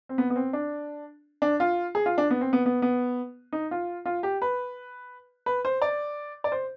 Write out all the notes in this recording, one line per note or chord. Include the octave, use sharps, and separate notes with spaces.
C4
B3
B3
C4
D4
D4
F4
G#4
F4
D4
B3
C4
B3
B3
B3
D#4
F4
F4
G4
B4
B4
C5
D5
D5
C5